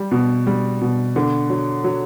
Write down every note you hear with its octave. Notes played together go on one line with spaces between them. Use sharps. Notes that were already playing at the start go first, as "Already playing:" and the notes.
Already playing: G3
B2
G3
B2
D3
F#3
F#3